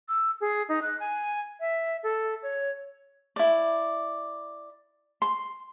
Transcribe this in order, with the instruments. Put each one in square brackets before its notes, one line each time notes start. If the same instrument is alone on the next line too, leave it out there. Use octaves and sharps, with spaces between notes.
[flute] E6
G#4
D#4
F#6
G#5
E5
A4
C#5
[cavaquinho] E4 D5
C6